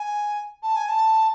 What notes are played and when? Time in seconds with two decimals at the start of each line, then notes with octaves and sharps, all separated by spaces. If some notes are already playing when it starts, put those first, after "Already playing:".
Already playing: G#5
0.63 A5
0.76 G#5
0.89 A5